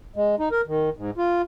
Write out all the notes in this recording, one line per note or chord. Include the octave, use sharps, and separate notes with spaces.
G#3
D#4
A#4
D#3
G#2
F4